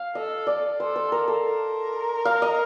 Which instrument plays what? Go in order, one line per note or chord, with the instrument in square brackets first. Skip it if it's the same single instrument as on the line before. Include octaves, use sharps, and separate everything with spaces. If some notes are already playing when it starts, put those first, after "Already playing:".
Already playing: [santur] F5
[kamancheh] A4 [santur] D#5
[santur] D5
[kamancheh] A4 [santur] C5
[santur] C5
A#4
A4
[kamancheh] A#4
[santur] F5
D#5